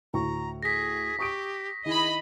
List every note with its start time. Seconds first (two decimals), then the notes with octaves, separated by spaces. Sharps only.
0.13 D2 A2 A#5 C#6
0.63 G#4 A#6 B6
1.19 G4 C#6 D#6 D7
1.85 D#3 E4 G#4 D#5 B5